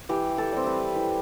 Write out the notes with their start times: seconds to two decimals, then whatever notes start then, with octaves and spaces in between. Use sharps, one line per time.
0.09 E3 G4
0.38 A4
0.52 G3 C4
0.67 B4
0.96 E3